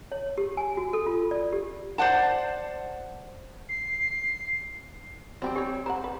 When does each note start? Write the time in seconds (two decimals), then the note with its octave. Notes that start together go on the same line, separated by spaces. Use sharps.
0.12 C#5
0.38 G4
0.57 G#5
0.77 F#4
0.93 A4
1.06 F4
1.31 D5
1.53 G4
1.98 C5 D5 F#5 A5
3.69 C7
5.42 F#3 G3 C4 D5
5.56 G4 C#5 G#5
5.86 C5 C#5 F#5 A#5
6.04 B4